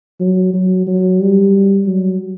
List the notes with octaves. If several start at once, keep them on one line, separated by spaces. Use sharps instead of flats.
F#3
F#3
F#3
G3
F#3